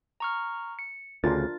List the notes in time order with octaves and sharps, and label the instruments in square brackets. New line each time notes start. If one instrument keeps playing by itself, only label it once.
[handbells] A#5 C#6 F6
C#7
[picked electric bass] D2 C#3 [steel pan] D4 F4 A#4 [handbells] A6